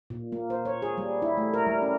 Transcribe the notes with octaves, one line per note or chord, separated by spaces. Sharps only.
A#2
A#3
C5
C#5
G#4
G3
E4
A3
A#4
G3
C#4